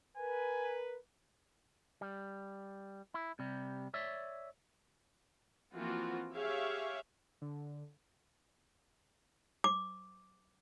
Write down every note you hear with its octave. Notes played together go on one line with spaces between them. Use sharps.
A#4 B4 G#5
G3
E4
C3 G3
C#5 D5 E5
E3 F3 A#3 C4 F4 F#4
G4 G#4 C#5 E5 F5
D3
D6